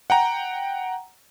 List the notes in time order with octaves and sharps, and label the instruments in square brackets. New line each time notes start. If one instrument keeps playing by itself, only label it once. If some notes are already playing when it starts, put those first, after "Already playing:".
[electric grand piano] F#5 G5 A#5